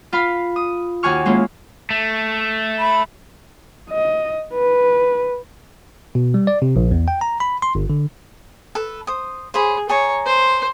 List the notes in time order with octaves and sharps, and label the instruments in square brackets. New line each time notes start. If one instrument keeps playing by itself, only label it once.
[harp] F4 F5 B5
D#6
D#2 F#4 G#5 C#6 F6
G#3 A#3 C#4 E4 F4
[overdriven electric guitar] A3
[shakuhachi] B5
[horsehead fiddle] D#5
B4
[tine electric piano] B2
G3
D5
C3
A#1
E2
G5
A#5
B5
C6
G1
D3
[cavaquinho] A4 B4
C5 D#6
[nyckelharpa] G#4 [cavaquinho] C5 C#5 B5
[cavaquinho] G#4 A5 A#5 [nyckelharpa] C#5
[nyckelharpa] C5 C6